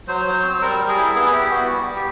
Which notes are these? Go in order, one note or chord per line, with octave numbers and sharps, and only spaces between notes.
F#3 C5
F#3
C4
G3 A#4
G3
G#4
E4
B3 G#4
E4 G4
B3 F#4
G3
G3
G4